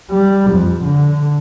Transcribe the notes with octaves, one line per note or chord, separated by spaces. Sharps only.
G3
F2
D3